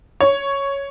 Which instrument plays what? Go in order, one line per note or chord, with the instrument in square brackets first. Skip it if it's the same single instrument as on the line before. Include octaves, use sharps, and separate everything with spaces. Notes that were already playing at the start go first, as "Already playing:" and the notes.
[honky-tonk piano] C#5